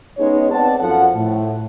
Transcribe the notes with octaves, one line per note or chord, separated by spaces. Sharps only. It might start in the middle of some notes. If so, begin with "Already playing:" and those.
G#3 B3 C#4 D#4 G#4 C#5
B3 C4 D5 F#5 A5
F#2 F3 A4 F#5
A2